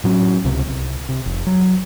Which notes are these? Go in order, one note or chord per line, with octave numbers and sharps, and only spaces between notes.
A2 F#3 C#4
C#2 C3
C2
C3
F1
F#3